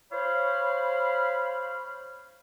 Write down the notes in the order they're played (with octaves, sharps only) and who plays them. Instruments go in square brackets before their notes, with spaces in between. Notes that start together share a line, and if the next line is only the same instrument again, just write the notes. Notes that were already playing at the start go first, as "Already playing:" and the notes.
[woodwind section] C5 C#5 F5 B5